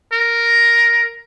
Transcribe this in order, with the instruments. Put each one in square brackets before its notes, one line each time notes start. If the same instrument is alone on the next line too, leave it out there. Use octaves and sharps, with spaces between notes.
[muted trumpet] A#4